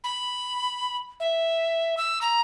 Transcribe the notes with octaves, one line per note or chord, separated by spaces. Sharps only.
B5
E5
E6
A#5